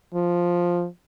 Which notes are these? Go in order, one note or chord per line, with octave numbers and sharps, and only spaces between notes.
F3